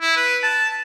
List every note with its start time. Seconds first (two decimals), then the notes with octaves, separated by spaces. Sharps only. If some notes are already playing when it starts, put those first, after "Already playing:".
0.01 E4
0.16 B4
0.43 A5